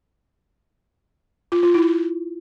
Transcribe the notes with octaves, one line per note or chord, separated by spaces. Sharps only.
F4
F4
E4